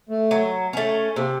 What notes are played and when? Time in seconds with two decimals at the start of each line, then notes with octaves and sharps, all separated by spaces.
0.09 A3
0.31 F#3
0.73 A3 C#4
1.15 C3 A#3